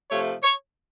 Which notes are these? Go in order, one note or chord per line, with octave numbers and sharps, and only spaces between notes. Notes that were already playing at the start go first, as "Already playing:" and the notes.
C3 F3 A3 C#5
C#5